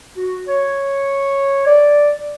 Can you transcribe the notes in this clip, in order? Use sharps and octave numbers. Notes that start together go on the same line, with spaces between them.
F#4
C#5
D5